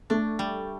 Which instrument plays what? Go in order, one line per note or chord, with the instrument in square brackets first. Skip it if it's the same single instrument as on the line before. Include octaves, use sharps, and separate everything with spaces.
[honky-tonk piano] A3 [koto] D4
[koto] G3